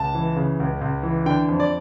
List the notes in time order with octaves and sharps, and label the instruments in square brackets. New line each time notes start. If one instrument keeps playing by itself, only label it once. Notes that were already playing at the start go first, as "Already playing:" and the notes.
Already playing: [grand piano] C#2 A5
E3
C#3
C#2
C#2
E3
D3 G5
F2
D5